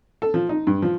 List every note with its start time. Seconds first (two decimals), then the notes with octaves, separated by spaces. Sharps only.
0.22 A4
0.34 F3
0.49 D#4
0.67 G2
0.82 F3